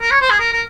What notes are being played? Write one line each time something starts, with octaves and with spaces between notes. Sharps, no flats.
A#4
C#5
C5
G#4
A#4
A#4